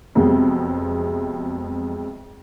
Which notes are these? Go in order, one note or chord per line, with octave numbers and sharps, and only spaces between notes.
F2 C3 F#3 G#3 B3